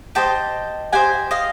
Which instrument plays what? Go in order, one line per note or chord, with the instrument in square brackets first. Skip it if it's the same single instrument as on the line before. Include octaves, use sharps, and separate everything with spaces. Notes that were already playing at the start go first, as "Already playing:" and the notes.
[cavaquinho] G4 C5 D#5 G5 A5
G4 C5 D#5 F#5 G#5
D#5 F5